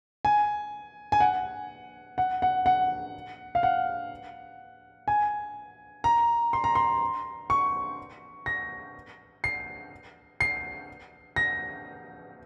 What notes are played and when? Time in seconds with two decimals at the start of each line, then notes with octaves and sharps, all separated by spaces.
0.25 G#5
1.12 G#5
1.20 F#5
2.18 F#5
2.42 F#5
2.66 F#5
3.55 F5
3.63 F#5
5.08 G#5
6.04 A#5
6.53 C6
6.64 A#5
6.75 C6
7.50 C#6
8.46 A#6
9.44 C7
10.40 C7
11.36 A#6